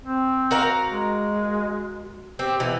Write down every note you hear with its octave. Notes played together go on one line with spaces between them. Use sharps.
C4
F#4 A#4 F5
G#3
C4 G4
B2 E3